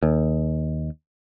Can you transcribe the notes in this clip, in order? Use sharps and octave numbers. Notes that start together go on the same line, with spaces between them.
D#2